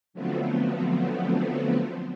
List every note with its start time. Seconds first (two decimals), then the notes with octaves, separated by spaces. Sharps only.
0.13 D3 F3 F#3 A3 B3 C4